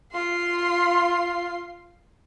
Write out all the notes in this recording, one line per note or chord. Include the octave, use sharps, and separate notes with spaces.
F4 C6